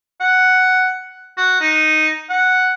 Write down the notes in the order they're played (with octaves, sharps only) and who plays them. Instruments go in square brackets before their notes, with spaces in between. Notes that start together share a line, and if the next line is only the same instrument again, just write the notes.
[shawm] F#5
F#4
D#4
F#5